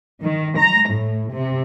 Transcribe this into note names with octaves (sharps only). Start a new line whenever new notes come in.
D#3
A#5
A2
C3